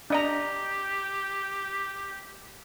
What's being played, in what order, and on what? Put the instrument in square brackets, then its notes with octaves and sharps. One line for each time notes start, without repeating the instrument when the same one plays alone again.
[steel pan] D4 D#5 A#5 [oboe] G4